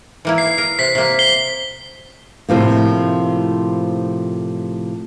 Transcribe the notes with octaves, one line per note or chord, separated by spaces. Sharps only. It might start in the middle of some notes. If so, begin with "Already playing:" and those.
E3 A#3 E4
C7
A#4
C3 B6
C3 A#3
C7 G7
A2 C3 F3 A#3